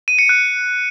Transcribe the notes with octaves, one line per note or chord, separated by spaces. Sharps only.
D#7
C#7
F#6